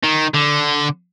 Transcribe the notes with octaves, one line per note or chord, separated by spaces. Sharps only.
D#3
D3